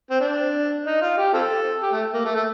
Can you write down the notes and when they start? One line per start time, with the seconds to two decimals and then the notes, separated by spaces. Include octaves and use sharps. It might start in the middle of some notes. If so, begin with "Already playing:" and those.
0.11 C4
0.20 D4
0.85 D#4
1.01 F4
1.18 G4
1.33 C4 F4 A4
1.82 G4
1.92 A3
2.13 A#3
2.25 A3
2.35 A3